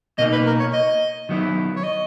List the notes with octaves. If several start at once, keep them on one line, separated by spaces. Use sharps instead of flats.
B2 A#3 D#4 D#5
B4
A#4
C#5
D#5
D#3 F#3 B3 E4
C#5
D#5